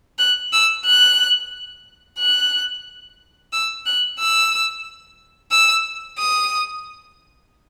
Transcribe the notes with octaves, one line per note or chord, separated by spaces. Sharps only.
F#6
E6
F#6
F#6
E6
F#6
E6
E6
D#6